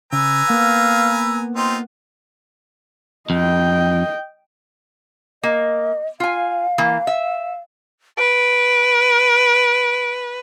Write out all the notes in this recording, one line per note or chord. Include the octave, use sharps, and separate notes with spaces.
C#3 B4 G#5 A#5 E6
A#3 B3 F5
C4 D#4 F4 C6
F2 D#5 G5
A#3 D#5
F4 F5 G#5
E3 A#3
E5
B4 D7